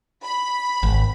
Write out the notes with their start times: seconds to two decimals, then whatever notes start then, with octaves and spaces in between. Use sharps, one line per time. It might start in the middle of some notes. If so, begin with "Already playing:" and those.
0.24 B5
0.83 G#1